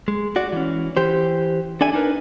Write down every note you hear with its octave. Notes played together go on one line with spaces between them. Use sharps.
G#3
F#4 D5
E3 C#4
E3 G4 C5
D4 A4 D5 E5 G#5
D4 D#4 A#4 B4